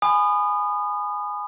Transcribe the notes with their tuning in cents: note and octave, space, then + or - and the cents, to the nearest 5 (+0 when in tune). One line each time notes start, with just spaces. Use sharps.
G#5 +0 B5 +20 D#6 -25